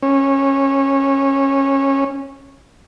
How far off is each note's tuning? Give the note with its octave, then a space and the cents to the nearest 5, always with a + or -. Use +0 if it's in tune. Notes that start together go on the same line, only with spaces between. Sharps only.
C#4 -20